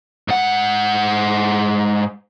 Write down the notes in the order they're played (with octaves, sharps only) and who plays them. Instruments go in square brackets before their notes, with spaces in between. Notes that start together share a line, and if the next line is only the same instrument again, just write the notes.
[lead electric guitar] G#2 F#5